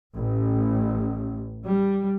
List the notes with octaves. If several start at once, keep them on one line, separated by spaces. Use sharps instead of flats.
A1
G3